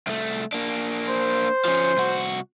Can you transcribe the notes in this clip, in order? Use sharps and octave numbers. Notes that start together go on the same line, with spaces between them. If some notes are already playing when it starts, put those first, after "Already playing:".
C2 A3
A#3 D4
C5
F3 C#4
C2 F#4